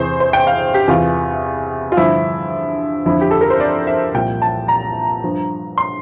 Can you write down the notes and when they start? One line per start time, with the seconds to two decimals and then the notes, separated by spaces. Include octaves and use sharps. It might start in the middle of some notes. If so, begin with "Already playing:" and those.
Already playing: E2 C3 E3 C5
0.20 C5
0.33 G5
0.47 F5
0.74 G4
0.88 E2 C3 E3 F4
1.92 F4
1.97 G2 D3 F3 E4
3.06 F2 D3 F3 E4
3.21 G4
3.31 A4
3.41 A#4
3.50 C5
3.60 D5
3.87 E5
4.14 C2 A#2 F3 G5
4.42 A5
4.68 A#5
5.23 G2 F3
5.78 C6